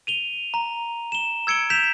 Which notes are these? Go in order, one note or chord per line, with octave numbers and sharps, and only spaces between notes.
D#7 F7 G7
A#5
E7 G7
E6 G#6 C#7 D7 G7
G6 B6 E7 F7